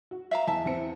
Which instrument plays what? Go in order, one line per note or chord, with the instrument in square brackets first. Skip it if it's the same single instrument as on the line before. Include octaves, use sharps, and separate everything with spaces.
[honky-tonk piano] F#4
[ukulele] E5 F5 A#5
[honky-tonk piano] E2 [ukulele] E5 A5
[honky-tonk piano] E2 C4 C#7